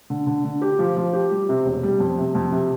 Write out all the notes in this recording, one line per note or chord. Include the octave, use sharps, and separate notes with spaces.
D3
D3
D3
G4
F3
F3
G4
G3
C3
E1
G3
F2
C3
F2
C3